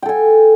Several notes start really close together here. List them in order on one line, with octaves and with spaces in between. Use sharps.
G5 A4 G#5